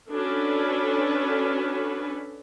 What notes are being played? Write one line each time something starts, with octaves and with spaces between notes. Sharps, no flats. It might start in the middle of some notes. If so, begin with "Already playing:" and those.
C#4 D4 F#4 A4 B4